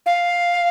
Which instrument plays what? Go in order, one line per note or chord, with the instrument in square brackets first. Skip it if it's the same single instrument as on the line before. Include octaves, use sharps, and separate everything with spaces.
[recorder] F5